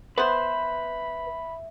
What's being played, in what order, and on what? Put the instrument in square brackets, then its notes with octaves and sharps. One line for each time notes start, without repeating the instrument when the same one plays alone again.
[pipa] B3 C5 [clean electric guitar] B4 [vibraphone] E5 [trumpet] B5